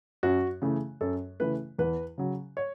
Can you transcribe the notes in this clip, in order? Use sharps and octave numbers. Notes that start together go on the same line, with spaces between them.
F#2 F#4
C#3 E3 A3
F#2 A4
C#3 E3 A3 B4
E2 B4
C#3 F#3
C#5